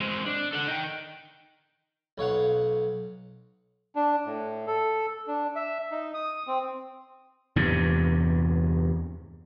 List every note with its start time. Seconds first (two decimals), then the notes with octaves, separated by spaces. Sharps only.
0.01 G#3 C4
0.26 D4
0.53 A4 F#5
0.67 D#4 G5
2.18 B1 C#5 F5 F#5
3.95 D4
4.26 A2
4.67 A4
5.27 D4
5.56 E5
5.92 D#4
6.14 D#6
6.47 C4
7.56 E2 G2 C3